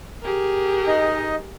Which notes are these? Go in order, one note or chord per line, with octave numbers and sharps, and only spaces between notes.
G4 G#4 A#4
D#4 D#5